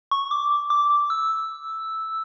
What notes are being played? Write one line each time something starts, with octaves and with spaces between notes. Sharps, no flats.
C#6
D6
D6
E6